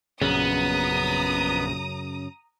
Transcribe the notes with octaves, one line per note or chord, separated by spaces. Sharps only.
A#1 F#2 C#3 B3 A#5 D#6